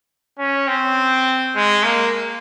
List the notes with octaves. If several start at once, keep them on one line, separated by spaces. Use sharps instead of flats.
C#4
C4
G#3
A#3